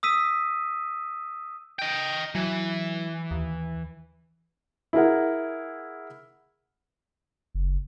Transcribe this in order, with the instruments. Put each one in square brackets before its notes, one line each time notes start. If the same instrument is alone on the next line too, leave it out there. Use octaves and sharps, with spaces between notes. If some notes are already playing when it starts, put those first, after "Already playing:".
[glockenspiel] D#6 E6 B6 D#7
[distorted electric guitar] D#5 G5
[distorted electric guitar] E3 [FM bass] F#3
[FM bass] D#2
[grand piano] E4 G#4 A#4 F#5
[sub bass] F#1